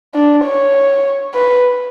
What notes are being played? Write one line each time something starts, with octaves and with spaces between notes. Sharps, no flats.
D4
C#5
B4